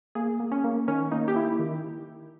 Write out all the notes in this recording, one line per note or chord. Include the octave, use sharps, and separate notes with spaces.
A#3 G#4
A#3
C#4
A#3
D#3 C#4
A#3 D#4
G4
A#3 E4
D#3